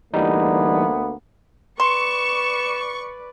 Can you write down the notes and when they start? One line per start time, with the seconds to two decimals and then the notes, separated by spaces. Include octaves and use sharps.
0.14 D2 E3 G3 A#3 B3 D#4
1.80 B4 D5 C6 C#6 E7